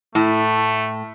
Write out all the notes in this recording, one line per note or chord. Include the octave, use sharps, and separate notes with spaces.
A2 A3